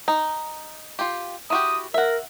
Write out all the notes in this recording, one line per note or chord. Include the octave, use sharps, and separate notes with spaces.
D#4
F4 G4
E4 F#4 G4 D#6
A#4 E5 F#5